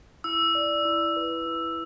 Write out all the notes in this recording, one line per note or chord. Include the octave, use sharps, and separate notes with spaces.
E4 E6
D5
E4
B4
E4